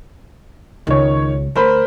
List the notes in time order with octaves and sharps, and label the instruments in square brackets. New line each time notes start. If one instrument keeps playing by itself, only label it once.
[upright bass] C#2 [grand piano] D#3 C#5
[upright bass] D2 [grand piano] A#4 C5 B5